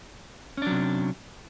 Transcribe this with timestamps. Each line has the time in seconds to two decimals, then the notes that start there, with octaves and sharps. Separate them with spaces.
0.57 C#4
0.62 D4
0.67 F#3
0.71 C3